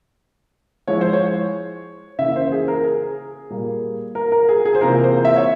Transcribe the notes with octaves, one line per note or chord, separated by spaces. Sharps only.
F3 G#3 E4 C#5
C5
C#5
C#3 E3 A#3 E5
C5
G#4
A#4
G#4
A#2 G3 A#3
A#4
A#4
G#4
G#4
C5
C3 E3 A#3 F4 A#4
C5
E5
C#5